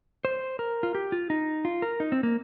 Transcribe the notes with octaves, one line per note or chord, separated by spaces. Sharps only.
C5
A#4
F4
G4
F4
D#4
F4
A#4
D#4
C4
A#3